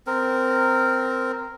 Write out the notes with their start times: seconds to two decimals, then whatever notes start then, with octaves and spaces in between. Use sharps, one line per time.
0.07 C4 A#4